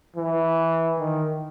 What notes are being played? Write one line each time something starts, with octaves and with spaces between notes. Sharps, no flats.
E3
D#3